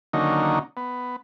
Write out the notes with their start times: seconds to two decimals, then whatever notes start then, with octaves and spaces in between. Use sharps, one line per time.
0.13 D3 D#3 F#3 A#3 C#4 D#4
0.77 B3